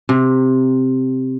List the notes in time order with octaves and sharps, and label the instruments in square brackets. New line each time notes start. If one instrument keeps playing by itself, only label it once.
[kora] C3